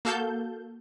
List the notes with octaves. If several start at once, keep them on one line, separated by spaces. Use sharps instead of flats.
A#3 F#4 A4 F5 A5 G6